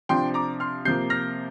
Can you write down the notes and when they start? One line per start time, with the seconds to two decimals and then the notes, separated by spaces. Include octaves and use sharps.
0.09 C3 F3 D4 G5 C6
0.34 A#5 D6
0.60 C6 F6
0.85 C3 F3 A#3 G6 C7
1.10 F6 A#6